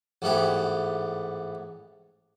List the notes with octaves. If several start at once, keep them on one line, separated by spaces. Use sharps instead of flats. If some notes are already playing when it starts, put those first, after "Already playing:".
A1 G#2 A3 B3 G4